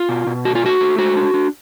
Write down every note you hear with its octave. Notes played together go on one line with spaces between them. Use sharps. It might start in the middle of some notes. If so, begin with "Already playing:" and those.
Already playing: F4
B2
B2
A3 F#4
F4
A3 F#4
A3
G#3 F#4
D4
D4